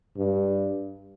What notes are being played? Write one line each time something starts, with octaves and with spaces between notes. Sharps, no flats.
G2